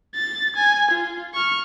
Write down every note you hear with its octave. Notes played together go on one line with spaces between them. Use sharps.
A6
G#5
F4
C#6 F6